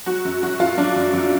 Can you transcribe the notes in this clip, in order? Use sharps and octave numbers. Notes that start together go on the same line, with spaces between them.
F#3 F#4
F#2
F#3 F#4
F#2 F4
F#3 D4
F#2
F#2